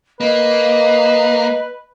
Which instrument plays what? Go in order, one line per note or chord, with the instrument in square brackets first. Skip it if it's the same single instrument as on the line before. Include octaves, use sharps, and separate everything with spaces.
[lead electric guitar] A#3 [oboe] B4 [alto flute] D#5